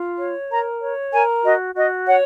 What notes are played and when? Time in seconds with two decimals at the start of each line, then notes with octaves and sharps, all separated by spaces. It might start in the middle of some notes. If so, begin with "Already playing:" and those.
Already playing: F4
0.19 C#5
0.50 A#4 A#5
0.81 C#5
1.13 A#4 G#5
1.44 F#4 D#5
1.75 F#4 D#5
2.06 C#5 F#5